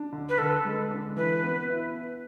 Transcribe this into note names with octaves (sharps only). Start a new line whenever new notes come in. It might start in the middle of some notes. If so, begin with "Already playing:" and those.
Already playing: D4
D3
B4
D3 A4
G#3
D4
E3 B4
B3
E4